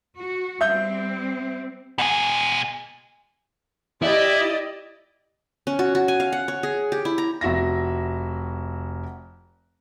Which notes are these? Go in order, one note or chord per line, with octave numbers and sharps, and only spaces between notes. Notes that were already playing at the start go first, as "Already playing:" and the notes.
F#4
G3 C4 E5 G6
B2 G#4
E4 G4 D5 D#5
C#4
F#4
F#4
G#5
F5
F#5
C#5
G#4
G4
E4
A#5
F1 F#4 E5 A#6